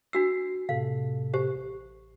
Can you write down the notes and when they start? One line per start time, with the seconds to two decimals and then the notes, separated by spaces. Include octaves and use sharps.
0.13 D4 F#4 E6 C7
0.69 A2 C3 A4 F5
1.34 G4 C5
1.56 A1